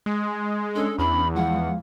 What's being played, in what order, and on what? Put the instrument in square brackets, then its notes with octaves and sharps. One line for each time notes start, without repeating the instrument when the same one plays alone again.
[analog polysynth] G#3
[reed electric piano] C#4 D4 [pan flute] A4
[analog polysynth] E2 [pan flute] B5
[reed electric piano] F3 G#3 F5 [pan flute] F#5